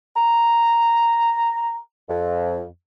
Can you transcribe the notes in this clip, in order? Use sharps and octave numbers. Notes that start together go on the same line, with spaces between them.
A#5
F2